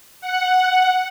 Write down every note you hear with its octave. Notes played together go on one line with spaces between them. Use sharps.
F#5